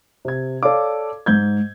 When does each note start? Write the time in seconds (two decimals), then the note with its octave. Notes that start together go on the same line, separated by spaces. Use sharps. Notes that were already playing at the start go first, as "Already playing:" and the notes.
0.25 C3 G#6
0.63 A4 C#5 D5 F5 D6
1.26 G#2 G6 G#6